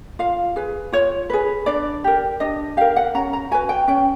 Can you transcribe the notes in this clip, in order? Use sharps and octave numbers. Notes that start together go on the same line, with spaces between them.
F4 F5
G#4 B4
F4 C#5
G#4 B4
D4 D5
G4 A#4
D4 D#5
G4 A#4 F5
F#5
C#4 A#5
A#5
F#4 B4 G#5
G5
C#4 G5